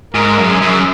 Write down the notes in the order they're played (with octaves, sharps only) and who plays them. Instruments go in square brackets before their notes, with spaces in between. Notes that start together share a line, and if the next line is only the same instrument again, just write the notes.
[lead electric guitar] G#2 [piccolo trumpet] A#4
[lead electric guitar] F#2
[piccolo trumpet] G#4
[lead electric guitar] F#2